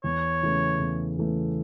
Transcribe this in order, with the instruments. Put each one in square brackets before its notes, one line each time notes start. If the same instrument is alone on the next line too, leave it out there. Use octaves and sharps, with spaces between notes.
[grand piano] E2 [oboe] C#5
[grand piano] C#3 E3 A3
E2
C#3 E3 A3